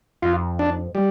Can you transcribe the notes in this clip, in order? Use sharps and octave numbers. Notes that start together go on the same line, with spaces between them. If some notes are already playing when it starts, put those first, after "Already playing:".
F2 F4
D4
G3